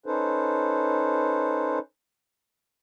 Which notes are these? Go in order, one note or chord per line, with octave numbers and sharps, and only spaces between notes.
C#4 D#4 A4 B4 C5